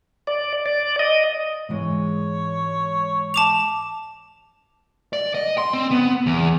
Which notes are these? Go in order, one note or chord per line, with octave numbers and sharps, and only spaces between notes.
D5
D5
D#5
G#2 E3 G#3 C#5
A5 D6 F7
D5
D#5
C6
C4
B3
E2